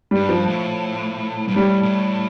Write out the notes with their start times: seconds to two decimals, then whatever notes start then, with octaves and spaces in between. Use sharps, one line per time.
0.11 G2 G3
0.29 F3
0.48 A2
1.48 G2
1.56 A2 G3
1.83 A2